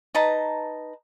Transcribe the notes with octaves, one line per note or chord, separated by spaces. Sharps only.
D#4 B4 A5 A#5